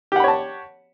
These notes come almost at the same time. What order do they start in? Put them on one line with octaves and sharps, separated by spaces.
G4 F#5 B5 C#5 A5